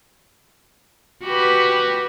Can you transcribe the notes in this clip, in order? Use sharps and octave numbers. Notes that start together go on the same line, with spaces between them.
F#4 G4 B4